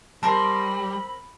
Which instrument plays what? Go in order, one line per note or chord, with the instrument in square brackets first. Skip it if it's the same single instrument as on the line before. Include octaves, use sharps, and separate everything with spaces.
[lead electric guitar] G3 [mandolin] C4 A#4 C6 [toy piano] A5 [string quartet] B5